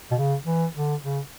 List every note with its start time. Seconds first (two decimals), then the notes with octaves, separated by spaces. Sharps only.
0.12 B2
0.15 C#3
0.45 E3
0.75 D3
1.04 C#3